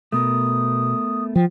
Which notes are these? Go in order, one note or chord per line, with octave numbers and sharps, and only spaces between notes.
B2 A3 B3 A#4 D#6
F3 G5